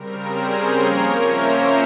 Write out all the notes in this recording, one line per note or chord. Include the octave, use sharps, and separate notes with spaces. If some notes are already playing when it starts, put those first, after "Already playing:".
Already playing: C#3 G3 C4 A#4
G#4 C5
A#4 C#5
F3 A#3 C#4 A#4 C#5
C5 E5